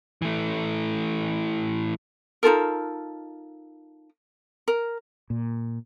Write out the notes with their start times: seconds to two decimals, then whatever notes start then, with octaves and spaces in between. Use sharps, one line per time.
0.22 E3 A3
2.43 D#4 F4 A4 A#4
4.68 A#4
5.30 A#2